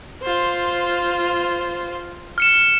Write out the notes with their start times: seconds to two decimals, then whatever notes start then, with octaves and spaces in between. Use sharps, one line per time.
0.23 F4 C5
2.38 F6 C#7 E7